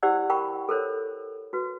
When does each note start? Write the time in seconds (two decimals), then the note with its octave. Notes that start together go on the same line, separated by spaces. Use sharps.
0.03 E4 G4 C5 D5 F#5 E6
0.29 A#4 G5 B5 C#6
0.69 A4 A#4 C5 C#5
1.53 F#4 B4